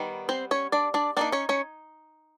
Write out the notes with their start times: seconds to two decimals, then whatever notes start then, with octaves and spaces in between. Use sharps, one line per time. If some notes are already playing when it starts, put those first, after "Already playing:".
Already playing: D#3 G3 B3
0.29 C4 C5
0.51 C#4 C#5
0.72 D4 D5
0.94 D4 D5
1.17 G3 A#3 D4 D#4 D5
1.32 C#4 C#5
1.49 C#4 C#5